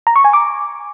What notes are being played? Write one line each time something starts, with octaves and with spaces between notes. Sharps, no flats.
A#5
C#6
G#5
D6